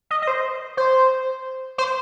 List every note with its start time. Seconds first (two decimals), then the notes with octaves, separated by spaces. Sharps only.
0.11 D#5
0.22 D#5
0.27 C5
0.77 C5
1.78 C5